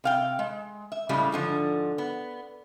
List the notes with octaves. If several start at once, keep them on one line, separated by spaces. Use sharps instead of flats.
C3 F5 G5
G#3
E5
A2 C#3 G3 G#3
G#2 D3 F3
B3